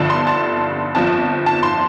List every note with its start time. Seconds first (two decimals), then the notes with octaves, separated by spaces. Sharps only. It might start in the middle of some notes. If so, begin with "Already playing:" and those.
Already playing: G1 G2 D3 F3 A5
0.10 C6
0.27 A5
0.95 G1 F2 F3 A5
1.46 A5
1.63 C6